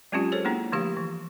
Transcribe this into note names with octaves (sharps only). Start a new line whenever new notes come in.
F#3 G#3 C4 C#4 F4 G4
G#4 A4 C5 C#5
A#3 B3 D4 E4
D3 F3 A3 G4 F5
E3